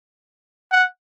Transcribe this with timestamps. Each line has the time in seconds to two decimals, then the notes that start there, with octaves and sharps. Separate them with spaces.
0.72 F#5